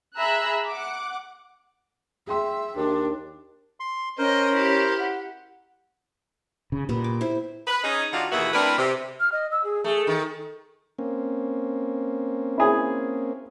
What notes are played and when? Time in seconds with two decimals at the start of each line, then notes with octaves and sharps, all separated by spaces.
0.16 G#4 E5 A#5 B5 E6 F#6
0.66 F#5 D6
2.27 G#4 E5 G5 C6
2.77 D#2 D4
3.80 C6
4.18 C#4 A#4 C5 D#5 G5
4.53 E4 G4
4.99 F#5
6.72 C#3
6.89 A#2 G3 B3
7.04 D6
7.21 E4 C5
7.67 B4
7.83 C#4 D#4 G#4
8.13 D3 G3 D#4 F4 F#4
8.32 D#2 B2 E3 F#4 G#4 E5
8.53 A3 C4 D4 E4 A#4 B4
8.78 C3
9.19 F6
9.32 D#5
9.51 E6
9.64 G#4
9.84 A3 G#4
10.07 D#3
10.99 A#3 C4 C#4
12.58 E4 G#4